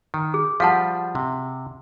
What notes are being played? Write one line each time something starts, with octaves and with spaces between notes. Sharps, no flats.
D#3
G#4
F3 G3 F5 F#5 A5
C3